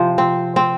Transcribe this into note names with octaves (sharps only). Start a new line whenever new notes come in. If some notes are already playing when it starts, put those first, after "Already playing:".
Already playing: C3 F3 C5
C4
C4